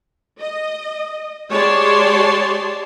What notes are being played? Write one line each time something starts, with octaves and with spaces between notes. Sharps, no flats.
D#5
G#3 G4 C#5 D5 A5 C6